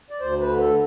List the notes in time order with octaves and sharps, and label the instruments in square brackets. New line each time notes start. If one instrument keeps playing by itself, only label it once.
[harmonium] D5
D2 C5
B4
D3
A4